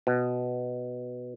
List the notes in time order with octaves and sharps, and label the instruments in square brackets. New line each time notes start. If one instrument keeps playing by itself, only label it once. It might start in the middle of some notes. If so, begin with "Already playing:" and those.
[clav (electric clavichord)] B2